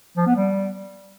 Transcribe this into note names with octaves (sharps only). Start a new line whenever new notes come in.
F3
B3
G3